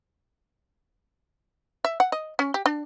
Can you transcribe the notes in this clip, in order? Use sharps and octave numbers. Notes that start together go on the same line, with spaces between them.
E5
F#5
D#5
C#4
G4
D4